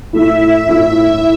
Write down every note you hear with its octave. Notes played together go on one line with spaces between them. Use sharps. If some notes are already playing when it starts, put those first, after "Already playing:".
A2 A3 E4 E5
A2 A3 E4